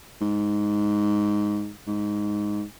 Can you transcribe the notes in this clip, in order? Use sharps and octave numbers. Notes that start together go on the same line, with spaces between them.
G#2
G#2